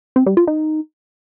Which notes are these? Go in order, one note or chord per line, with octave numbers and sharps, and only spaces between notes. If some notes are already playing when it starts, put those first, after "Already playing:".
C4
G3
F4
D#4